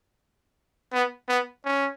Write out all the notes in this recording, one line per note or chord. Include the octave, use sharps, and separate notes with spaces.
B3
B3
C#4